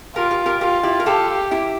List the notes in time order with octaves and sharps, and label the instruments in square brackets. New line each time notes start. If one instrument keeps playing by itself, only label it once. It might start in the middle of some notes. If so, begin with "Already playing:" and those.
[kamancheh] F4 [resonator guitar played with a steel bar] G4 A#4
[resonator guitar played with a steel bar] G4 A#4
G4 A#4
[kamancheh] F4 [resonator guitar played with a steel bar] G4 A#4
[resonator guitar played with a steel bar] E4 G4
A#4
[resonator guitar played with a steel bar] F4 A4 [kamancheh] G4
[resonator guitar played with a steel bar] E4 G4